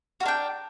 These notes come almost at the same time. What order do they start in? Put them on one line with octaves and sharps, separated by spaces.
F#4 A#4 D4 G5